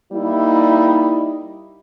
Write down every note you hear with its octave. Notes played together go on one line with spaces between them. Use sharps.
G3 A#3 D#4 E4